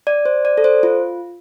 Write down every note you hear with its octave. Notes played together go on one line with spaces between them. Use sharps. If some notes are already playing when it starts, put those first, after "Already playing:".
D5
C5
D5
A4
C5
F4